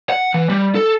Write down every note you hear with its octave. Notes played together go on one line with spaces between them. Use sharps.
F#5
E3
G3
A4